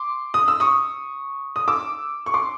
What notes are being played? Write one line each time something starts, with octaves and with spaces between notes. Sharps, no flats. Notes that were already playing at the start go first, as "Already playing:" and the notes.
Already playing: C6 D6
D#6
E6
C#6 D#6
D#6
D6 E6
C#6
C6 D6